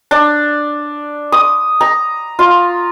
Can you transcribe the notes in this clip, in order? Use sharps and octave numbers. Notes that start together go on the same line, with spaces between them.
D4
D#6
A#5
F4